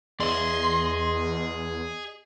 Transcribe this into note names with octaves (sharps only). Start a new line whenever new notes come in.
E2 G#4 D5 D#5 C6